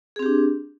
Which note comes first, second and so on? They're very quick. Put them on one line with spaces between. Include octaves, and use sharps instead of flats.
G#4 C4 G4 D4